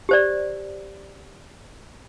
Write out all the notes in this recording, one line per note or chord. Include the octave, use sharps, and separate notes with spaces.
G4 C5 D5